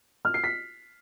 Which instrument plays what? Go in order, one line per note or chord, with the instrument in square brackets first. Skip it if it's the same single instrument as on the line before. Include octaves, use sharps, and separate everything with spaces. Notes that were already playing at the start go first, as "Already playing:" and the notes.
[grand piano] F6
C7
B6